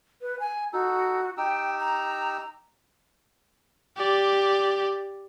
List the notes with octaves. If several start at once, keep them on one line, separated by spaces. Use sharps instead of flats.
B4
G#5
D#4 F#4 A4
D#4 G4 G5 E6
A#5
G4 D5